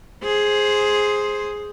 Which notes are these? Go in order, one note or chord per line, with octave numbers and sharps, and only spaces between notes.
G#4 C5